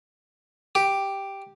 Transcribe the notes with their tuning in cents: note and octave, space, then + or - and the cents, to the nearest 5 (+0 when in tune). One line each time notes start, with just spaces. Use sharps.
G4 +0